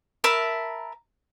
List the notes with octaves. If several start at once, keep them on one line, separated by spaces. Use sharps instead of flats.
A#4 E5 A5 B5